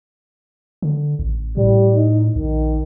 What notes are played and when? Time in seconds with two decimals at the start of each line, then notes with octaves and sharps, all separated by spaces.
0.82 D3
1.19 A1
1.57 A2 G3
1.95 D#4
2.36 A#1 D#3